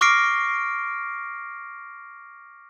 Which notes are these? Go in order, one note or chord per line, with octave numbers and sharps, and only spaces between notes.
C#6 D6 F6 A#6 C7 D7